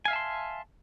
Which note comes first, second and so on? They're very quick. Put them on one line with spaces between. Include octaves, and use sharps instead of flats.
G#5 F5 E5 A5 C6